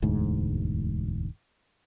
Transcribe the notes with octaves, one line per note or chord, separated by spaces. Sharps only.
E1 D2 G#2